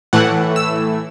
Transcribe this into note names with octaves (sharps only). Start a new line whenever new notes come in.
A2 E3 A3 F#5
E6